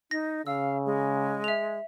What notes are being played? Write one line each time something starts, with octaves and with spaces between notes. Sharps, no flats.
D#4 A#6
C#3 F5 E6
G#3
E5 F7